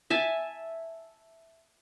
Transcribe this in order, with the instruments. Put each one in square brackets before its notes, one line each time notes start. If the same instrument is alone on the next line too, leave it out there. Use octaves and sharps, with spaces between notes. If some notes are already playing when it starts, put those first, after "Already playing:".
[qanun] E5 G#5 A5